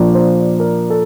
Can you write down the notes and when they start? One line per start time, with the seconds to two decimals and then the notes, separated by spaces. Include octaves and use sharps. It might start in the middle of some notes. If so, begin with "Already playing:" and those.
Already playing: A#2 F3 A#3 D4
0.15 C5
0.60 A#4
0.90 A4